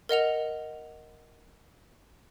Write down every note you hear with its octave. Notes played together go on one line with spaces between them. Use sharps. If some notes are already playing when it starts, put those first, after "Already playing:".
A#4 D#5 F#5 F7